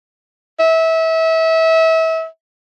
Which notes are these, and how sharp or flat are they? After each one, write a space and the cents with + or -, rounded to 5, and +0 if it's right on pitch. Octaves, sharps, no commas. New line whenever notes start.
E5 -30